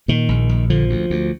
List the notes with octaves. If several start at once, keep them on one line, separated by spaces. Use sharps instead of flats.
A#2 D#3
A#1
A#1
D3 F3
D2
D2